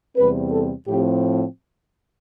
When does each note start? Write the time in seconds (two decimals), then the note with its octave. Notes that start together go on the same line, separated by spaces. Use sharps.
0.16 E2 C3 G3 C4 B4
0.52 A4
0.88 A2 F3 C4 G4